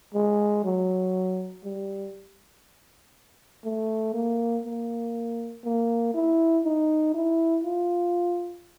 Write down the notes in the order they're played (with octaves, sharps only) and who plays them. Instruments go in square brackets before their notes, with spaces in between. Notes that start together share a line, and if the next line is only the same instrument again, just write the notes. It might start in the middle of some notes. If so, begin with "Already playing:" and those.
[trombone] G#3
F#3
G3
A3
A#3
A#3
A#3
E4
D#4
E4
F4